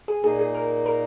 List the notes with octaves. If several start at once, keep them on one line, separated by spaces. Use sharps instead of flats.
G#4
A#2 A#3 D#4 G#4
G#4
A#4
A#4